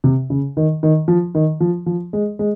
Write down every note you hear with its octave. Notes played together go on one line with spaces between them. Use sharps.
C3
C#3
D#3
D#3
F3
D#3
F3
F3
G#3
G#3